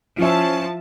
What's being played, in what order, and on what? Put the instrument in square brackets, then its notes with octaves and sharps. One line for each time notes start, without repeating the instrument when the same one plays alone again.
[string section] F3 A5 [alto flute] C#4 [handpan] F4 E5